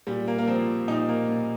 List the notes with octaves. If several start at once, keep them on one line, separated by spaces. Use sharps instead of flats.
A#2 G3
A#3
A#3
F3 C4
A#2 D#4
A#3
A#2